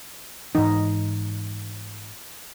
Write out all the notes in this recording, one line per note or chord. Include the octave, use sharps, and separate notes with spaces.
G#2 E3 D#4